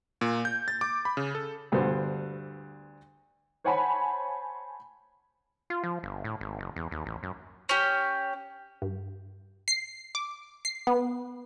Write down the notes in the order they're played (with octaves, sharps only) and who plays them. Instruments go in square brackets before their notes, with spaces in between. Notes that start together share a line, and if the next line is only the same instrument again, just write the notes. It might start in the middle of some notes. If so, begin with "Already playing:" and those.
[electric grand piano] A#2
G6
A6
D6
B5
C#3
A4
[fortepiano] D2 G2 D3 B3 C5
[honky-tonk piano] C5 C#5 F#5 G#5 A5 B5
[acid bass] F4
F3
G1
A2
G#1
F#1
E2
D#2
A1
F#2
[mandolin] C#4 G4
[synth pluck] G2
C7
D6
C7
B3